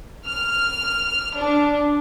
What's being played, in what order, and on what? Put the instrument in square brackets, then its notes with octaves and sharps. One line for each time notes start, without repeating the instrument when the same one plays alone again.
[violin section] F6
D4